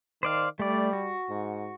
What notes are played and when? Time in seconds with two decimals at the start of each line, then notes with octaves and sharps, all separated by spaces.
0.23 D#3 C5 D5 F5
0.59 G3 A3 D5
0.93 F#4
1.29 G#2